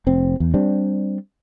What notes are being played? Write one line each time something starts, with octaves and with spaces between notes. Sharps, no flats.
F1 C4
E2
G3 C4 D4